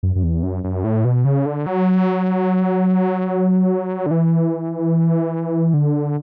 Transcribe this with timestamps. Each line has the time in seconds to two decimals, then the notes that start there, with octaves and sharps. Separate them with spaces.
0.03 F#2
0.15 F#2
0.23 E2
0.43 F#2
0.64 F#2
0.84 A2
1.05 B2
1.25 C#3
1.46 D3
1.66 F#3
4.06 D3
4.11 E3
5.74 D3